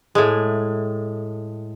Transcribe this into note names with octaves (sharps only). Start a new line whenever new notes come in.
A2 G#3